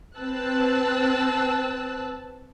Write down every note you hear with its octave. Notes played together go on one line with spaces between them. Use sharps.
C4 B4 A5 E6 F#6